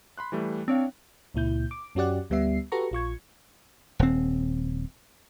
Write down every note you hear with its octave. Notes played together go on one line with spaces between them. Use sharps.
B5 C6 F#6
E3 G3 A3
C4 D4 C#5 F5
C#2 A#2 E4 G6
D6
F#2 C#4 F#4 G4 D5 F#5
D2 G3 B3 E5 C7
F#4 G4 A4 B4 A#5 C#6
A#1 F4 C#6 G#6
D#1 C4